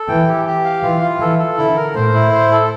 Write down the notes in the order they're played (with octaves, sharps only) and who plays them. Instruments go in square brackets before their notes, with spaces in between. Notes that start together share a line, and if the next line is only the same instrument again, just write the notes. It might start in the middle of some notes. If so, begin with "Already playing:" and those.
Already playing: [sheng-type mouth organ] A4
[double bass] E3 [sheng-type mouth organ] G5
[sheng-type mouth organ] G4
G4
F5
[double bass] E3 [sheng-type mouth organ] F4
[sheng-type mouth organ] F4
[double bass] E3 [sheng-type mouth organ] A4
[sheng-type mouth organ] A4
[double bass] D3 [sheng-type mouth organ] E4
[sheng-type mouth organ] A#4
[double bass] A2 [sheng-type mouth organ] C5
[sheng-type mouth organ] E4
C5
A4